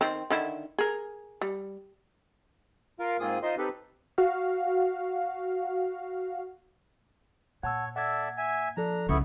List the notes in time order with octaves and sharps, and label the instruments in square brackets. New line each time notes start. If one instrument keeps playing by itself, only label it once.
[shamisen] D#3 C4
D3 D#3 E4
G#4 A#4
G3
[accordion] F4 A#4 F5
G#2 A#3 C4 F4 G#4 D#6
D#4 F4 C5 D#5 C6
C4 D#4 G4 A4 B4
[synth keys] F#4 F5
[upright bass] A#2 [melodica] C#5 [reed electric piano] F#5 A5 E6
[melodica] A4 D5 E5 [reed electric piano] F#5 G#6
[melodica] E5 G#5
[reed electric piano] F3 A4 [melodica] D4 A#5
[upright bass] C2 C#3 [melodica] B3 E4 C#6